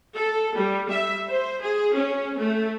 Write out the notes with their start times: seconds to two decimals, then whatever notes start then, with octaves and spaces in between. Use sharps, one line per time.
0.15 A4
0.56 G3
0.91 E5
1.30 C5
1.62 G#4
1.94 C#4
2.39 A3